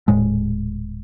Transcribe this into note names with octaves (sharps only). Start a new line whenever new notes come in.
D#1 A2 G#3